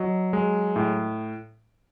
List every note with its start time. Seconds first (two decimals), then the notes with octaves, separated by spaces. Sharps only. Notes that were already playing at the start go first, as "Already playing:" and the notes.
Already playing: F#3 D#5
0.33 G#3
0.76 A2